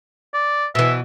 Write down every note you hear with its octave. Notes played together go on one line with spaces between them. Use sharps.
D5
B2 E3 E5